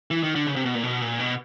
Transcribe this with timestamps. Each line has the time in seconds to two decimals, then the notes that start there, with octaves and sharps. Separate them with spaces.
0.11 E3
0.23 D#3
0.35 D3
0.47 C#3
0.56 C3
0.65 B2
0.75 A#2
0.83 B2
1.01 A#2
1.19 B2